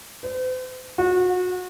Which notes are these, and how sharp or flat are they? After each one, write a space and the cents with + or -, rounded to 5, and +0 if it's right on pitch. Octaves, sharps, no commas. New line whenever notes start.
C5 -45
F#4 -30